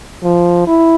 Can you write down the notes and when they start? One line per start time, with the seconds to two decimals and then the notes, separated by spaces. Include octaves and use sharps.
0.23 F3
0.67 E4